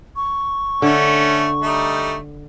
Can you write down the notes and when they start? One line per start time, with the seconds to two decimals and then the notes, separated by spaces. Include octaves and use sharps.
0.16 C#6
0.82 D3 A3 C#4
1.62 G3 A3 D#4